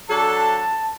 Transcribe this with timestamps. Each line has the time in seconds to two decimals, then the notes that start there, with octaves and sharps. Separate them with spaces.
0.10 F#3 D4 A4 A5